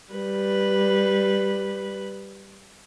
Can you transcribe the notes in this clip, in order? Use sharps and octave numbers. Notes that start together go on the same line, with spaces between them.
G3 B4